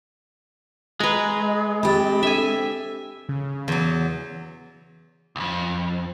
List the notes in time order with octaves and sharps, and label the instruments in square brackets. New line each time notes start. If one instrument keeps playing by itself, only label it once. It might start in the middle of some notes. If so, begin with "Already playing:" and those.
[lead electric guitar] G#3 [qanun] B4 A#5
[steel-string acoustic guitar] C4 G4 [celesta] B5 A6
[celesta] D4 A4 [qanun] E5 G#5
[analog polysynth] C#3
[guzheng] E2 F#3
[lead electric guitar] C2 F2